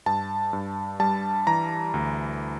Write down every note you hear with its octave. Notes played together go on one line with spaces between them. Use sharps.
G2 A5
G2
G3 A5
E3 A#5
D2